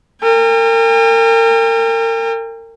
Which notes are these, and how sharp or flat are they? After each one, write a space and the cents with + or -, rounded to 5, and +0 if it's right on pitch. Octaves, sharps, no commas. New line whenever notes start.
A#4 -35 G5 +45